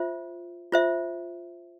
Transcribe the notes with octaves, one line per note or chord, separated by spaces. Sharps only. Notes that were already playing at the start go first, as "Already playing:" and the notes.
Already playing: F4 C5 E5
F4 C5 E5